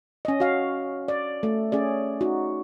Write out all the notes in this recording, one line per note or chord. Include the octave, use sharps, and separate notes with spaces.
C#4 D#5
F#4 F5
D5
A3
C#4 G#4 D5
D#4 F#4